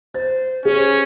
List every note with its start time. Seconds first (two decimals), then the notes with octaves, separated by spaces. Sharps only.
0.14 C5 A6
0.65 C#4 G#4